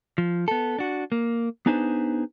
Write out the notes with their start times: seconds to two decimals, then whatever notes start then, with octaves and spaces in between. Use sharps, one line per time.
0.18 F3
0.48 B3 A4
0.78 D4 F#4
1.12 A#3
1.66 B3 D4 D#4 G#4 B4 C5